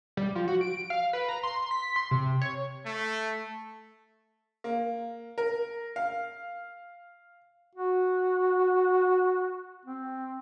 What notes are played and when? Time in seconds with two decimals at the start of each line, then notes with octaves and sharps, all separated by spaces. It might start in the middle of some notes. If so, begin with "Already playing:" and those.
0.17 G3
0.35 F3
0.48 F#4
0.61 D7
0.90 F5
1.13 B4
1.29 A#5
1.43 C6
1.71 B6
1.96 C6
2.11 C3
2.42 C#5
2.85 A3
4.64 A#3
5.38 A#4
5.96 F5
7.75 F#4
9.85 C4